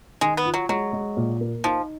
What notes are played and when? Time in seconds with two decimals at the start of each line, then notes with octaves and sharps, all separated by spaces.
0.21 D#3 G#3
0.37 B3
0.45 F4
0.54 F#3
0.69 F#3 G#3
0.93 G#3
1.17 A#2
1.41 A#3
1.64 F3 D#4